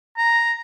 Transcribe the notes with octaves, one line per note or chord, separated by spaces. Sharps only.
A#5